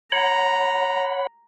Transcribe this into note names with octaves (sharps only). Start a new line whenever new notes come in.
C#5 F#5 A#5 B5